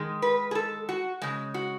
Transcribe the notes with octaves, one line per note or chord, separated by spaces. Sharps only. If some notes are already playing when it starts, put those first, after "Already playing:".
Already playing: D#3 G#3
B4
G#4
A4
F#4
C#3 G#3
F#4